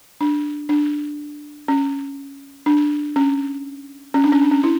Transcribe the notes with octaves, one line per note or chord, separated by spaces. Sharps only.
D4
D4
C#4
D4
C#4
C#4
D4
C#4
D4
C#4
E4